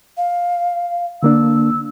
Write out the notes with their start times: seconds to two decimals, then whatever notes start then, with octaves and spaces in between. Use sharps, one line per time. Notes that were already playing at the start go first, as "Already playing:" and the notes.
0.17 F5
1.23 D3 A#3 D4 E6